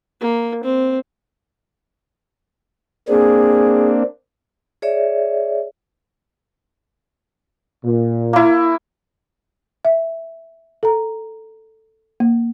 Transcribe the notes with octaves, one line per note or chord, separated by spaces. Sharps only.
A#3
C4
A#3 C4 D4 G#4
G#4 C#5 D5 E5
A#2
A#3 E4
E5
A4 A#5
A#3